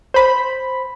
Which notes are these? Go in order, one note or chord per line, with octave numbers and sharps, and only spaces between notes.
C5 B5